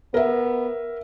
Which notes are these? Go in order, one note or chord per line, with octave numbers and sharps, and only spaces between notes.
B3 A#4 E5